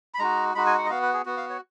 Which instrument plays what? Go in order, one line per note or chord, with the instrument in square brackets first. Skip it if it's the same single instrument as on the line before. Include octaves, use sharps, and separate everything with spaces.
[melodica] B5
G#3 D#4 F#4 A#5
G#3 D#4 F#4 B5
G#5
F#5
D#5
B3 F#4 F5
B4
G#4
B3 F#4
F5
C#5